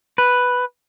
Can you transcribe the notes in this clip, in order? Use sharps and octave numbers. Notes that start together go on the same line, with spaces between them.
B4